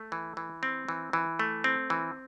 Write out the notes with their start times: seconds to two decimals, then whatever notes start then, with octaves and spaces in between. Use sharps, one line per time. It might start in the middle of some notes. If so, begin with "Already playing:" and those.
Already playing: A3
0.12 E3
0.37 E3
0.63 C4
0.89 E3
1.13 E3
1.39 A3
1.64 C4
1.90 E3